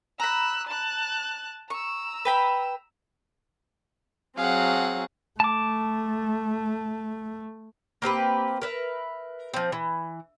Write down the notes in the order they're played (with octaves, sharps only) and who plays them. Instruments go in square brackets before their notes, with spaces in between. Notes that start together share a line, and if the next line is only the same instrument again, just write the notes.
[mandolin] A#5 B5 [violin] E6 F#6
[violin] A5 F#6
[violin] A#5 E6 [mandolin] C#6
[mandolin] B4 G5 B5
[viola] F#3 C4 [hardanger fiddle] G#4 F#5 [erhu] F5
[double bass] A3 [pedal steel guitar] A5 D6
[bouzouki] A#3 C4 G4 B4
A#4 B4 E5
F3 C4
E3